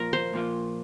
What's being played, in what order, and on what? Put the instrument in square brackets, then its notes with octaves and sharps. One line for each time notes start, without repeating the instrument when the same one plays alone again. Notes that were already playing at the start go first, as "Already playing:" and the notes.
Already playing: [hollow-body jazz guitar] A#2 F3 A#3 F4 [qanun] A#4
[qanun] C5
[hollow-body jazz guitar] A#2 F3 A#3 F4